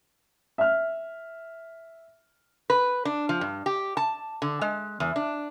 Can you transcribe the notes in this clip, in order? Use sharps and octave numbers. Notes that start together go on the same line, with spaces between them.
E5 F6
B4
D4
F3
G2
G4
A5
D3
G#3
E2
D4